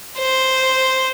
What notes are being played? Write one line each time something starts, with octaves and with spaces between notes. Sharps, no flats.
C5